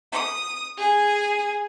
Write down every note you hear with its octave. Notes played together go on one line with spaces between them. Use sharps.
D#6
G#4 G#5